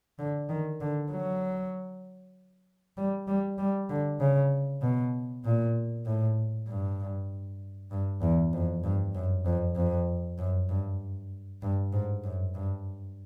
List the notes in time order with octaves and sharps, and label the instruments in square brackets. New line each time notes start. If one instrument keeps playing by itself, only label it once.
[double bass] D3
D#3
D3
F#3
G3
G3
G3
D3
C#3
B2
A#2
A2
G2
G2
E2
F2
G2
F#2
F2
F2
F#2
G2
G2
G#2
F#2
G2